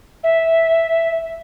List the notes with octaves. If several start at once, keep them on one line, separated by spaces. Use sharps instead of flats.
E5